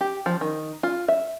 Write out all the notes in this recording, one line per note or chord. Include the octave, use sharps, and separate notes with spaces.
G4
F3
D#3
F4
E5